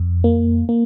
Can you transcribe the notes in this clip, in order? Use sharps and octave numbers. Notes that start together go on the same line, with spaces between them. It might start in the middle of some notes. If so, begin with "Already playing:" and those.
Already playing: F2
A#3
A#3